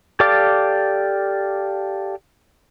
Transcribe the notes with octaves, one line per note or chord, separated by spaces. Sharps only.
G4 A4 D5 F5 D6